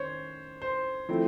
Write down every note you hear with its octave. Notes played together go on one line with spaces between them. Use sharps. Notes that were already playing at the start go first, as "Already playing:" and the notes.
Already playing: D#3 C#4 C5 C#5
C5
F3 A3 C4 E4